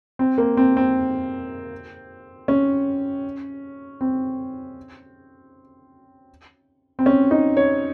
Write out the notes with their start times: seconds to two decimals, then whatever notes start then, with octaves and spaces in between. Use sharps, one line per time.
0.19 C4
0.38 A#3
0.57 C4
0.77 C4
2.48 C#4
4.01 C4
6.99 C4
7.06 C#4
7.31 D#4
7.57 C#5